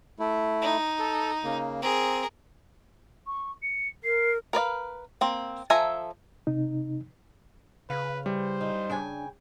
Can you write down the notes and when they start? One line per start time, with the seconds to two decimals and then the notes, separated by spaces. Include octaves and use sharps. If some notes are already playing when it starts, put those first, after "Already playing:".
0.19 A3 E4
0.62 D#4
0.99 A4
1.44 C#3 A#3
1.82 C4 G#4 A#4
3.26 C#6
3.62 C#7
4.04 A#4 C7
4.53 A#4 B4 D5 F5
5.21 A#3 C4
5.70 F3 A4 E5 G#5 A#5
6.47 C3 D#4
7.90 C#3 B4 F5
8.26 E3 G3 C5
8.60 F#2 D#4 F4
8.90 C#3 D4 G5 G#5